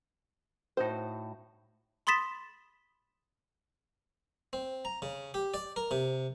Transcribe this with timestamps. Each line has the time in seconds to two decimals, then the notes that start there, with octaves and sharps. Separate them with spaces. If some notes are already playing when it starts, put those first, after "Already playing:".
0.77 A2 D#4 F#4 C5
2.07 B5 C6 D#6 A6 B6 E7
4.53 C4
4.85 A#5
5.02 C#3
5.34 G4
5.54 D5
5.76 A#4
5.91 C3